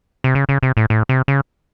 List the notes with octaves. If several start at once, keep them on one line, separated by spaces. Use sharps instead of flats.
C3
C#3
C#3
C3
A2
A2
C3
C#3